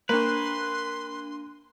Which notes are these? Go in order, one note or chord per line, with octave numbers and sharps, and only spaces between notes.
A#3 D4 B4 C6 F#6 D#7